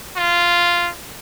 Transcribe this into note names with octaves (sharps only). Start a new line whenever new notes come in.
F4